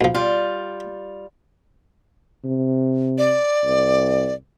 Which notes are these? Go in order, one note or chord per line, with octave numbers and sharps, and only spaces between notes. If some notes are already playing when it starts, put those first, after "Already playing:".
B1 F3
G3 F4
C3
D5
C2